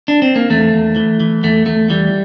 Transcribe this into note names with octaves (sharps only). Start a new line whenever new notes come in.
D4
C4
A#3
E2 A3
E2
E3
E3
E2 A3
E2 A3
E3 G3